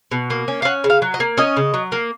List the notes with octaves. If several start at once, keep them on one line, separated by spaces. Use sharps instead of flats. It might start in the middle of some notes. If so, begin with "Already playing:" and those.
B2
A#3
C#4
F5
C#4 F#5
C#3
F5
F#3
D#5
A#3
C#4 D#5
C#3
F#3
A#3